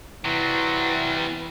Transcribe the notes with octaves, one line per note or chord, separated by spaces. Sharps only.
C3 E3 F#3 G3